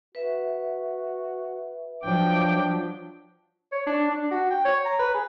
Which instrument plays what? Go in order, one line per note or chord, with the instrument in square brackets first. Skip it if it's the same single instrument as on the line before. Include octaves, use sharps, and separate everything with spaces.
[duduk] F#4 [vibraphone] B4 E5
[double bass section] F3 F#3 [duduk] D4 [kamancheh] G5 D6
[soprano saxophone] C#5
D4
D4
F#4
G5
C#5
A#5
B4
G#4